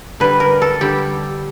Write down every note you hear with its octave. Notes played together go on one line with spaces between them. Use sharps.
D3 G3 B4
A#4
A4
D3 G3 G4